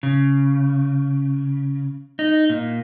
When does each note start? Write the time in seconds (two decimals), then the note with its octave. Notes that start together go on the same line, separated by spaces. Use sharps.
0.03 C#3
2.19 D#4
2.49 A#2